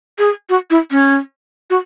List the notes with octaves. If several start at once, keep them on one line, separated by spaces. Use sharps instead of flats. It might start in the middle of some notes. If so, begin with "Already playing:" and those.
G#4
F#4
E4
C#4
F#4